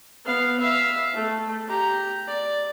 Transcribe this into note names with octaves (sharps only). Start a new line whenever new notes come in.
B3 F5
E5 F5
A3
G4 A#5
D5